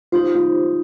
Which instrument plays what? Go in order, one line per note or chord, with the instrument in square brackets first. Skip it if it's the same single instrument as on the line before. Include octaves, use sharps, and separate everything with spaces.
[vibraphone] D#4 G4 C5 [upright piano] F4
[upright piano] F4